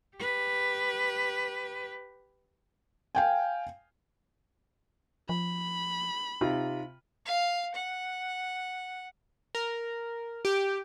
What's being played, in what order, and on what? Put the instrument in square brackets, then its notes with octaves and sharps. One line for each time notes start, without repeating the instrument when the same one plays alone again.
[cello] G4 B4
[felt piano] F5 G5 G#5
[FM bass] F3 [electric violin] B5
[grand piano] C3 F4 [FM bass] D#4
[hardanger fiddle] F5
F#5
[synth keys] A#4
G4